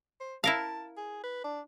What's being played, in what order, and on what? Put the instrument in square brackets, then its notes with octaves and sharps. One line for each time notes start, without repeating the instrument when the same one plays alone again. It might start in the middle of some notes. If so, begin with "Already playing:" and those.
[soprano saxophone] C5
[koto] E4 A#4 F5 [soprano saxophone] A5
[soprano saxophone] G#4
B4
D4